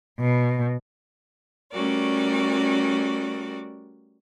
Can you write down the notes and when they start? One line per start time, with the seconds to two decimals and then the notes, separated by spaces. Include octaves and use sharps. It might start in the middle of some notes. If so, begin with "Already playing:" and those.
0.20 B2
1.72 G3 A3 C#4 F#4 A#4 D5